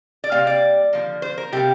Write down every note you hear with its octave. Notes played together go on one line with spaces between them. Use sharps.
D5
C3 G3 A#3 F5
D5
D3 F3 A#3
C5
A#4
C3 G3 A#3 G4